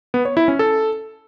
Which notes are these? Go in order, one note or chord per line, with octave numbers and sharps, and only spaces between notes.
B3
C#5
E4
C#4
A4